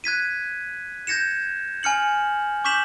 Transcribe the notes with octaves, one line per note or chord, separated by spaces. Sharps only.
F#6 G#6 B6 D#7
G6 G#6 A#6 C#7 E7
G#5 F6 C#7 F#7
C#6 D6 G6 B6 E7 F#7